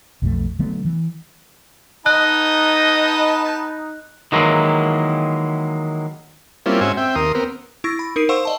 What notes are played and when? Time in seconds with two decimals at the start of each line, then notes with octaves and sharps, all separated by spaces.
0.22 B1 F2 E3 A3
0.59 D3 F#3 A3 B3
0.85 E3
2.06 B3 D#4 B4 D#5 A5 F#6
4.32 D#3 E3 F#3 G#3 A#3 E4
6.66 G3 A#3 C4 C#4 E4 F4
6.81 G#2 C#4 F#4 C5 E5 G#5
6.97 C4 E5 G5
7.15 D#2 A#4 C6 D#6
7.35 B3 C4 A#4
7.84 E4 C#6 E6 A6 A#6
7.99 B5
8.16 D#4 A#4 D#6 C7 D7 D#7
8.29 C5 F5 F#5 C6 C#6 E6
8.45 D5 D#5 A5